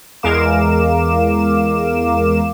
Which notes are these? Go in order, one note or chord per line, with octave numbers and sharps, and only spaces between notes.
E2 G#3 A#4 F5 D6 E7